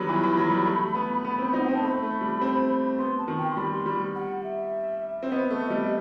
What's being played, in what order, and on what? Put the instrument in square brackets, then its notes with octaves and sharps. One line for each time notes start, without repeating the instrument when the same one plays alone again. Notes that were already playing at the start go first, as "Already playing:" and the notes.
Already playing: [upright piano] D#3 F#3 G3 B3 [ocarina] B5
[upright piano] E3
E3
F#3
G3
A3
B3
B3
C4
D#4
[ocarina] F#5
[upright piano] C4 [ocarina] G5
[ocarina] A5
[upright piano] A3 [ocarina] B5
[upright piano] A3
G3
C4
[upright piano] B3 [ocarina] C6
[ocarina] A5
[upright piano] D#3
[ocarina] G5
C6
[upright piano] G3 [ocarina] B5
[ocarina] C6
[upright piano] G3 [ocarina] B5
[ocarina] F#5
E5
[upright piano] C4
[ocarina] E5
[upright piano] B3 [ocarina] D#5
[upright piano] A3
G3